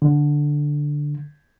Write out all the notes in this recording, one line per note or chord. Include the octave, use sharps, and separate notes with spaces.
D3